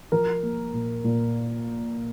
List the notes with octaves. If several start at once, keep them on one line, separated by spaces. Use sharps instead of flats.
F3 A#4
A#3
A#2
A#2